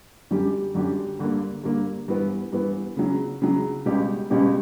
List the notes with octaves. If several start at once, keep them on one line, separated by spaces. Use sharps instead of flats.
F#2 D3 G3 C#4 G4
F#2 D3 G3 C#4 G4
G2 D3 A#3
G2 D3 A#3
G2 E3 B3
G2 E3 B3
C#3 F#3 C#4
C#3 F#3 C#4
C#2 B2 G3 C#4 G4
C#2 B2 G3 C#4 G4